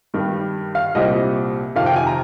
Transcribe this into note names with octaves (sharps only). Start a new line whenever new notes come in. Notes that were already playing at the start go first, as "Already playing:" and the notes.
G2 D#3 G3
F5
C2 A#2 G3 C4 D#5
F2 C3 D#3 F5
G5
G#5
A#5